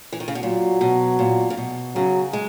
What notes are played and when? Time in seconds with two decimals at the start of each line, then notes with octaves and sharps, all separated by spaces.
0.13 E3
0.20 D#3
0.28 C#3
0.35 B2
0.43 A#2 F#3
0.81 B2
1.19 A#2
1.50 C#3
1.57 B2
1.95 C#3 F#3
2.33 G#3